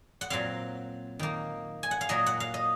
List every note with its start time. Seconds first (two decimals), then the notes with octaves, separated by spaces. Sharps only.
0.21 F#5
0.30 A#2 F#3 C4 F5
1.19 D#3 A#3
1.83 G#5
1.91 F#5
2.01 F5
2.09 A#2 F#3 A#3 D#5
2.26 F#5
2.40 F5
2.54 D#5